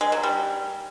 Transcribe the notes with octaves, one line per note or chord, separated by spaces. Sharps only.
G#3
F#3
G3